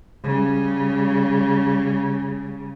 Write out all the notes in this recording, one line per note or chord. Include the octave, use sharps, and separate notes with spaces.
C#3 G3